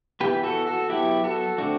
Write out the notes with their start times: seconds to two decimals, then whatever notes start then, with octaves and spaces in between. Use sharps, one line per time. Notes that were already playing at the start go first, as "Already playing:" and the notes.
0.20 E3 B3 G4 B4
0.43 F#4 A4
0.67 F#4 A4
0.90 F#3 B3 E4 G4
1.24 F#4 A4
1.58 D3 A3 C4 D4 F#4